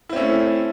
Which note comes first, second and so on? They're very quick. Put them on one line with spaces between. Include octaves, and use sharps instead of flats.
E4 C4 C#4 A3